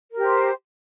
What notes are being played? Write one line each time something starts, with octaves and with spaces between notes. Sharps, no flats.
G4 A#4 C5